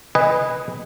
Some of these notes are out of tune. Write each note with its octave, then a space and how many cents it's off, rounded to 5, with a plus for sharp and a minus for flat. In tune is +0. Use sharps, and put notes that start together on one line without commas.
B4 +0 D#5 +0 G#5 -20